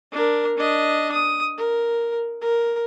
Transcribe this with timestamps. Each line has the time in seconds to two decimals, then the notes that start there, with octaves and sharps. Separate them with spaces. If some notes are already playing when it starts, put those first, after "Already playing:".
0.12 D4 A#4
0.57 D4 D#5
1.12 D#6
1.57 A#4
2.41 A#4